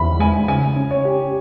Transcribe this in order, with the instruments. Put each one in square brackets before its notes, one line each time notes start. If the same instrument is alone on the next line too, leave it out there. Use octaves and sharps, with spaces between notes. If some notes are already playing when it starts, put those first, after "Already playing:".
Already playing: [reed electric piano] E2 [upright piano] B5
[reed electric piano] G#3 [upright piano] G#5
[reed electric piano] C#3 [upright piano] G#5
[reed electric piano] C#4
[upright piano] C#5
[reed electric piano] G4